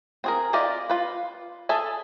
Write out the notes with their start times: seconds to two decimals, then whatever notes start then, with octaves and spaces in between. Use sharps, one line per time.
0.24 C4 G#4 A#4
0.53 E4 F4 G4 D5 D#5
0.89 F4 B4
1.69 G#4 A4 E5 G#5